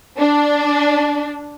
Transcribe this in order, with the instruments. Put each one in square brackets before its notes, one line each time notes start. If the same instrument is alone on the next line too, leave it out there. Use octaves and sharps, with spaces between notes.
[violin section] D4